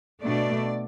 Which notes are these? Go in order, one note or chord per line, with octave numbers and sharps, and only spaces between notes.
B2 A3 D4 D5